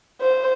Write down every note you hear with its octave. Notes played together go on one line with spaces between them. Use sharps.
C5